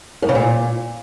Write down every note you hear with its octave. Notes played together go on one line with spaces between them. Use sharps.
F#2
C#3
A#2